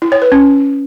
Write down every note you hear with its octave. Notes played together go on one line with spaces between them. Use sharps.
E4
C#5
B4
C#4